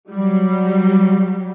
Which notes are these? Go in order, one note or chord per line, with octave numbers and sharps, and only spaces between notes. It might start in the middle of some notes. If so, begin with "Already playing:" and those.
F#3 G3